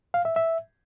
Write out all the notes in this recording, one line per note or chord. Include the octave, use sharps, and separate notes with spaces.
F5
E5
E5